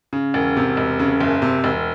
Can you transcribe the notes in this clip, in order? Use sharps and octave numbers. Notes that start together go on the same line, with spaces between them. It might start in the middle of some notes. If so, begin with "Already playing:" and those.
C#3
E1
C3
E1
C#3
F#1
C3
E1